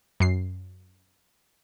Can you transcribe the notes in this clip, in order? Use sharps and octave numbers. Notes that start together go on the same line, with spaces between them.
F#2 C7